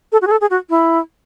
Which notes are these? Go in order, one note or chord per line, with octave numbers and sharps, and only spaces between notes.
A4
F#4
G#4
A4
G#4
F#4
E4